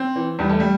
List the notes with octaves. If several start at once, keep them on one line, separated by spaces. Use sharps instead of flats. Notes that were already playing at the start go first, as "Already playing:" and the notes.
Already playing: C4
E3
E2 G3
A3
G3